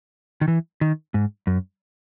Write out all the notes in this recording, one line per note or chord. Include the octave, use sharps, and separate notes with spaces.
D#3
E3
D#3
G#2
F#2